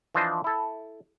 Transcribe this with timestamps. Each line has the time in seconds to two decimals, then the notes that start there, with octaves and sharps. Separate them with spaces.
0.15 E3 F3 D4 C5 D#5
0.44 E4 A4